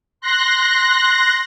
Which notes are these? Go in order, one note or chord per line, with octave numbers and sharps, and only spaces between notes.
C6 F#6 A#6